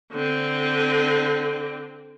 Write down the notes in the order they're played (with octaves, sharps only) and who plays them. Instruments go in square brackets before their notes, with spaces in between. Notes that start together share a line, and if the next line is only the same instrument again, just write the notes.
[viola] D3 C4